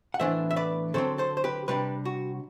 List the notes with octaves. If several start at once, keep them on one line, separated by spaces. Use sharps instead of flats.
F#5
A2 E3 B3 D4 C5 E5
E5
B4 D5
D3 F#3 C4 A4 C5
A4 C5
C5
G4 B4
C3 G3 D4 G4 B4
F#4